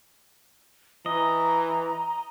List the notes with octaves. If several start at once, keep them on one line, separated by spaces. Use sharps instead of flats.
E3 D#5 A#5